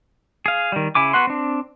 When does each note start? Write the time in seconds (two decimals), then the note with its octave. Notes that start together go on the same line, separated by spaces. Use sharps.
0.46 G#4 F5
0.72 D#3 G3
0.95 C#3 E4 G#5 D6
1.13 B3 F#4 F#5 C6
1.27 C4 D4